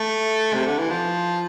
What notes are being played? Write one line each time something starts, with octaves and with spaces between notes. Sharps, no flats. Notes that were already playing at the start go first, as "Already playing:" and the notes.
Already playing: A3
C3
D3
E3
F3